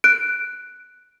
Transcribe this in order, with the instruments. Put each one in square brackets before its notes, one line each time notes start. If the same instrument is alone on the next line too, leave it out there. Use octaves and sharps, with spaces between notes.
[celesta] F#6 D7